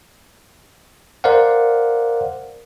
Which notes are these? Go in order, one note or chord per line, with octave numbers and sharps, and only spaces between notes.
A#4 C5 D5 F5 F#5